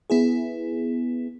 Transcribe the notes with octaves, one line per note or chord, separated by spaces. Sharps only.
B3 E4 G#4